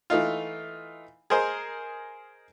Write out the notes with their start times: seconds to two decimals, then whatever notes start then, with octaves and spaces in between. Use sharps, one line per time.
0.10 E3 A3 D#4 F4
1.30 G#4 A#4 C5 D#5